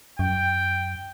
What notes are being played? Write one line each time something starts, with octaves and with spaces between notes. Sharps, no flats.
F#2 G5